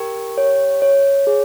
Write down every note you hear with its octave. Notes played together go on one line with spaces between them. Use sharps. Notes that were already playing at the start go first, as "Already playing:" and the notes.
Already playing: G4 A#4
C#5
C#5
G#4